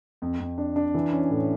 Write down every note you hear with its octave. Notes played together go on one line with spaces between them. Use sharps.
F2
F2
D4
D4
E3
C#4
A2